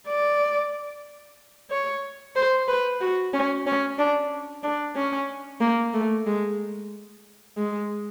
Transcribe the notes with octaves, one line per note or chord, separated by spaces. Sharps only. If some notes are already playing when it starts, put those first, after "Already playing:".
D5
C#5
C5
B4
F#4
C#4
C#4
D4
D4
C#4
A#3
A3
G#3
G#3